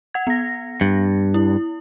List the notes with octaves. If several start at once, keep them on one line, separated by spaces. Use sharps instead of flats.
F#5 G#6
B3 A#6
G2
E4